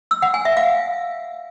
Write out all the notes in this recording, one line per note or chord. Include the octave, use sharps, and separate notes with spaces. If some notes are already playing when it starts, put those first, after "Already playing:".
E6
F#5
G#5
E5
F5